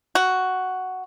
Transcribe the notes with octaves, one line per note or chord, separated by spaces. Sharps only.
F#4